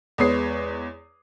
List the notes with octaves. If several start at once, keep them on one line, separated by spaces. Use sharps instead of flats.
E2 G#3 B4 C#5 D#6 C7